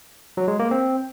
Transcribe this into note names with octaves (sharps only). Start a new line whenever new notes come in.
F#3
G#3
A#3
C4